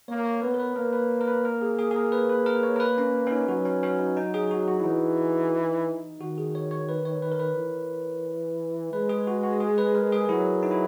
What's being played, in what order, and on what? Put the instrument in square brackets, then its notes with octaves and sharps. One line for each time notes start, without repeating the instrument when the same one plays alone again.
[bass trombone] A#3 [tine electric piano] C#5
[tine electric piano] C#5
[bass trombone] B3 [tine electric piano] B4
[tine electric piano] A#4
B4
[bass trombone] A#3 [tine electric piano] A#4
[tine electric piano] B4
A#4
B4
A#4
G#4
G#4
G#4
A#4
B4
B4
A#4
C#5
A#4
B4
C#4
C#4
D#4
[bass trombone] F#3 [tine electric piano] F#4
[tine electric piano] C#4
C#4
D#4
D#4
G#4
F#4
F#4
E4
[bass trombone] E3 [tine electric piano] D#4
[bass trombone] D#3 [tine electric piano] F#4
[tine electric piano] G#4
C#5
C#5
B4
C#5
B4
A#4
B4
[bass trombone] E3
[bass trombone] G#3 [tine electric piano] B4
[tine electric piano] G#4
F#4
F#4
G#4
B4
A#4
G#4
[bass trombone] F#3 [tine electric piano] E4
[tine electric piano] D#4
E4